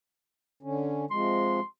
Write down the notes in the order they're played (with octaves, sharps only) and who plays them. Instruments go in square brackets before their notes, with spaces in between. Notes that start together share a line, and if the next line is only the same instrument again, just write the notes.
[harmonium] D3 C#4
[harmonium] C3 F3 G#3 [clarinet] C6